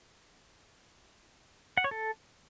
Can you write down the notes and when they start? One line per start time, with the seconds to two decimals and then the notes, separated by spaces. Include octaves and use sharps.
1.77 F#5
1.84 C#5
1.91 A4